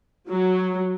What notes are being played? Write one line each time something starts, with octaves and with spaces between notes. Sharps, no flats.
F#3